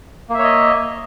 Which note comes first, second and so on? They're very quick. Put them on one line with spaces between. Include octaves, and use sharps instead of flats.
A#3 E5 C#5 D#5